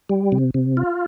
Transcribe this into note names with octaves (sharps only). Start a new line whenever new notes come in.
G3
C3
C3
F4